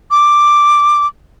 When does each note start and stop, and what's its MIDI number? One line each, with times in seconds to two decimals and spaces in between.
0.11 1.07 86